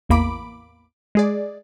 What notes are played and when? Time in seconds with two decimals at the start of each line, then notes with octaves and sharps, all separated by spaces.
0.09 A1 E2 A#3 B5 D6 D7
1.15 G#3 G#4 D5